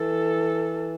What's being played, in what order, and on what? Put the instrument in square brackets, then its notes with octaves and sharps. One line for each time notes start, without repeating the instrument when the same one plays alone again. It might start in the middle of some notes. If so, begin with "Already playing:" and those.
Already playing: [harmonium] E3 [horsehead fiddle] A4